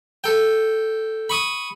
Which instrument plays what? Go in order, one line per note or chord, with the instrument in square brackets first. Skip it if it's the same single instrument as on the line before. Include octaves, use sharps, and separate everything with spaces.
[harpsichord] A4 G5
B5 C#6 D#6